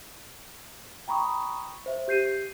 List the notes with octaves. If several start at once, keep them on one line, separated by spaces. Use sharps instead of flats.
G5 A#5 B5 C#6 D#6
C5 E5
G4 G6 C7 D#7